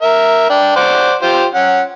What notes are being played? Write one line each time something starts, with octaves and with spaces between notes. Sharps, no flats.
A#4 E5
D4 G5
C5 D5 F#5
F4 G4 C5
C#4 F#5